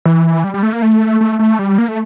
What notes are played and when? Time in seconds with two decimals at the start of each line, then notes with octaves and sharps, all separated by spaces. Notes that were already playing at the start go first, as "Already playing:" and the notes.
0.05 E3
0.44 G3
0.54 G3
0.63 A3
0.73 A#3
0.82 A3
1.21 A3
1.39 A3
1.59 G3
1.78 A#3
1.88 A3